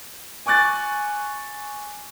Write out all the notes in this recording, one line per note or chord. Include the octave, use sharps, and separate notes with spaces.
G#5 C#6 D6 F#6 A6